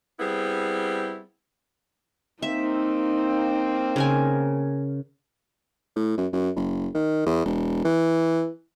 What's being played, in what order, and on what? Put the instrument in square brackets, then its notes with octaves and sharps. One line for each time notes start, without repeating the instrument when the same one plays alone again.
[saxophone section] G3 B3 C4 E4 G#4
[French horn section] A#3 C4 [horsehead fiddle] D#4 [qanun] E5
[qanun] C#3 A#4 G#5
[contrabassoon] A2
F#2
F#2
F#1
D#3
E2
E1
E3